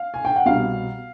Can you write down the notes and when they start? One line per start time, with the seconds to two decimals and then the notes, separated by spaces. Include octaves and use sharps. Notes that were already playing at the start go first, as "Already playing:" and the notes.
Already playing: F5
0.14 G#5
0.25 G5
0.36 F#5
0.46 C2 B2 G3 B3 F5